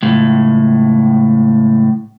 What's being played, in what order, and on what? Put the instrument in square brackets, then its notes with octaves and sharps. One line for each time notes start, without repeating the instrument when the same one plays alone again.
[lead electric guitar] C#2 A2